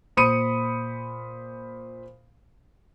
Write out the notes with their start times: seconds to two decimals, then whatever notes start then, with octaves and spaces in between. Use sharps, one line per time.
0.17 A#2 C5 B5 D#6 C#7 D#7